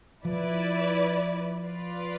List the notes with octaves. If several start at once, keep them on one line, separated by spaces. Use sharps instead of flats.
F3 E4 B4 D5
F4 B4 D5